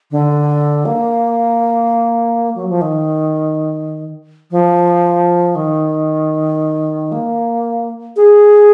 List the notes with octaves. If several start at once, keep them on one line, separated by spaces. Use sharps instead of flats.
D3
A#3
F#3
F3
D#3
F3
D#3
A#3
G#4